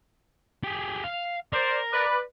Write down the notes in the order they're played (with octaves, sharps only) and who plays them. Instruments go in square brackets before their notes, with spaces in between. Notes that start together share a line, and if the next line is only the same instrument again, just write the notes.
[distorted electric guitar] G4 G#4
F5
[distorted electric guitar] A#4 [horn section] C5 D5
[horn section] B4 D5